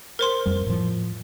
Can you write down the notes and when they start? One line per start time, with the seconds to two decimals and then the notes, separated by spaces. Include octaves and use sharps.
0.19 A#4 C5 C6
0.46 F2 G3
0.67 A2 F3